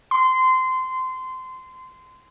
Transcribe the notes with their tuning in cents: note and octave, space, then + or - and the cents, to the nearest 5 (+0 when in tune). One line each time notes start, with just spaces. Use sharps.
C6 -20